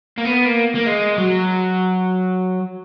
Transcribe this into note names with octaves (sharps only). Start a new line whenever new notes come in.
A#3
B3
A#3
A#3
G#3
F#3